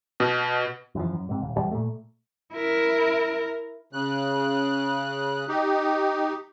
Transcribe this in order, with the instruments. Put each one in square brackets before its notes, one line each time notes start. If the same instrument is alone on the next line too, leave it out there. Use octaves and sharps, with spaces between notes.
[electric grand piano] B2
[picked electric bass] F#2 E3 F3
F#2
G#2 C3
D#1
E2 G3
A#2 A3
[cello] E4 A#4
[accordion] C#3 F#6
D#4 G4